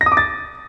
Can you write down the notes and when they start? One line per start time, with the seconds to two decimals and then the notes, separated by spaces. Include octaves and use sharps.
0.01 A#6
0.06 D#6
0.12 D6
0.17 A6